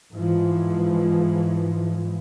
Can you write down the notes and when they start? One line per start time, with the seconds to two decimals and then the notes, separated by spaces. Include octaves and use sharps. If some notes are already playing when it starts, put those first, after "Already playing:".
0.14 G#2 E3 F3